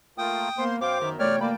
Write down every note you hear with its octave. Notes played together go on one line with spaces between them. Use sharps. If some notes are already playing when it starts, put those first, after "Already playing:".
A3 A#3 F4 G5 D#6
A#3 B3 C5 C6
F#2 C5 F5 G5 D6
D#3 A#4 E5
C3 E3 A3 C#5 D5 G5 F6
A#3 D5 A5 B5